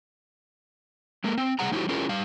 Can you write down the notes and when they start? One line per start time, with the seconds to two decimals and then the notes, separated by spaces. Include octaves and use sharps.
1.24 G#3 A#3 A#4
1.38 C4
1.59 C3 G3 G#4 F#5 A#5
1.72 F#3 D#4 E4 F#4 G4 C5
1.89 C#4 E4 F4 G#4 A#4
2.09 G3 F5